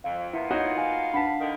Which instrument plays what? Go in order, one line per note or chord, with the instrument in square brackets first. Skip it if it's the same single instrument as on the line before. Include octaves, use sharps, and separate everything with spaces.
[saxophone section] F2 [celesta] F5
[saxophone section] A#3 B3 F4 [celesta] E4 [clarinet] E5
[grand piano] D#4 F#4 F#5 [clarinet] C#5
[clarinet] F5 [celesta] G#5
[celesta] D4 F#5 B6 [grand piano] A5 B5
[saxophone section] D3 D#3